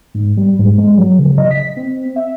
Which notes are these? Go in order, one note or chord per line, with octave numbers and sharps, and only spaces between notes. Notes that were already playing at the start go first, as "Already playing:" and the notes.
G#2
G3
G#2
G#3
F#3
C#3
D#5
B6
C4
E5